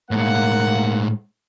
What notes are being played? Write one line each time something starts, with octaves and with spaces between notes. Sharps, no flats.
A2 G#3 A#3 F#5